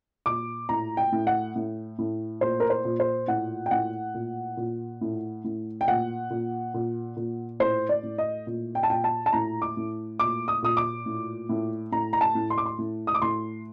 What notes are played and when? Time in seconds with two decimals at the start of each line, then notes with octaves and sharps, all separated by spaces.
0.26 A#2 D6
0.69 A2 A#5
0.97 G5
1.12 A2
1.27 F#5
1.56 A2
1.99 A2
2.41 A#2 C5
2.60 A#4
2.70 C5
2.85 A#2
3.00 C5
3.28 A2 F#5
3.66 G5
3.71 A2 F#5
4.14 A#2
4.57 A#2
5.01 A2
5.44 A2
5.81 G5
5.88 A#2 F#5
6.30 A#2
6.74 A#2
7.17 A#2
7.60 A2 C5
7.89 D5
8.03 A2
8.18 D#5
8.47 A#2
8.75 G5
8.83 A5
8.90 A#2 G5
9.04 A5
9.26 A5
9.33 A2 A#5
9.62 D6
9.77 A2
10.20 A#2 D6
10.48 D#6
10.63 A#2 D#6
10.77 D6
11.06 A2
11.49 A2
11.92 A2 A#5
12.13 A#5
12.21 A5
12.35 A2
12.50 C6
12.58 D6
12.66 C6
12.78 A2
13.07 D#6
13.15 D6
13.22 A2 C6